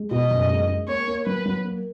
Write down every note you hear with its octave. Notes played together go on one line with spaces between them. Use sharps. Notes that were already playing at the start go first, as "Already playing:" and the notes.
Already playing: G#3
B2 D#5
F#1
G#3
G#3
A#3 C#5
A#3
F#3 B4
F#3
A#3